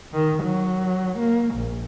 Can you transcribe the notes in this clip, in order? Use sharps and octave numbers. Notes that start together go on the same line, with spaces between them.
D#3
F#3
A#3
A#1